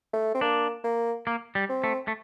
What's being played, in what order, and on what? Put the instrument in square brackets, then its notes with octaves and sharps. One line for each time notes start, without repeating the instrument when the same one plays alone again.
[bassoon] A3
C4
[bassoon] A#3 [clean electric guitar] D4
[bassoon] A#3
[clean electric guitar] A#3
G3
[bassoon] C4
[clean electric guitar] A3
A3